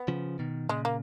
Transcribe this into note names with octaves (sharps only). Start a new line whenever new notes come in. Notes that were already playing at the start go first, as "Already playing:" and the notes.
Already playing: B3
C#3 F3
B2 D#3
A#2 C#3 G#3
A#3